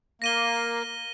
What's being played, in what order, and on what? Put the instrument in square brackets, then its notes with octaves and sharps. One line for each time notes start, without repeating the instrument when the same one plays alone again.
[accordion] A#3 [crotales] A#6 D#7 G7